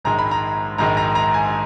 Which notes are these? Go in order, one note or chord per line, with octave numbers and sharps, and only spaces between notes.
A#1 G#2 D#3 G#3 A#5
B5
A#5
A#1 G#2 D#3 G#3 A#5
A#5
A#5
G#5